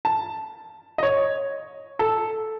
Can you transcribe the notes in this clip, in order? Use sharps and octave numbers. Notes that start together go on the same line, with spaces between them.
A5
D#5
C#5
A4